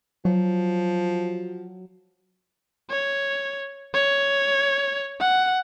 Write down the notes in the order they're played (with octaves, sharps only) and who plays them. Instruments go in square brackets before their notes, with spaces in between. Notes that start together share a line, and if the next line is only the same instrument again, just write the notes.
[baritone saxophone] F3 [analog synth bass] F#3
[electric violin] C#5
C#5
F#5